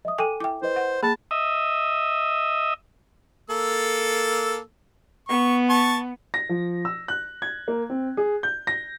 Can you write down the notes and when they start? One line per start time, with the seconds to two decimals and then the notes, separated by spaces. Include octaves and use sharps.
0.05 D#5 E5 D#6
0.18 A4 G5 G#5 D6 D#7
0.40 E4 E5 G5 D6
0.62 E4 B4 C5 D#5
0.76 F#5
1.03 A#3 G#4 A5 B5
1.31 D#5 E5
3.50 A#3 A4 E6
5.29 B3 C#6
5.70 A5 C#6
6.34 A#6
6.49 F3
6.85 E6
7.08 F#6
7.42 G#6
7.68 A#3
7.90 C4
8.17 G#4
8.43 G6
8.67 A#6